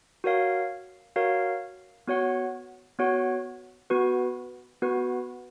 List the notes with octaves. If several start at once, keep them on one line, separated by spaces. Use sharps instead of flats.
F#4 A#4 C#5 F5
F#4 A#4 C#5 F5
B3 F#4 C#5 F#5
B3 F#4 C#5 F#5
B3 F#4 B4
B3 F#4 B4